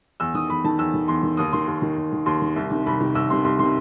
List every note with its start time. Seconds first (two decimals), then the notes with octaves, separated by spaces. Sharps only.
0.20 E2 E6
0.34 D#3 D#6
0.49 E2 B5
0.64 D#3 A5
0.78 E2 E6
0.94 D#3
1.08 E2 C6
1.23 D#3
1.37 D#2 D#6
1.53 D#3 C6
1.68 D#2
1.82 D#3
1.96 D#2
2.12 D#3
2.26 D#2 C6
2.42 D#3
2.56 C2
2.71 C3 D#3
2.86 C2 B5
3.00 C3 D#3
3.15 C2 E6
3.30 C3 D#3 C6
3.44 C2 C6
3.59 C3 D#3 C6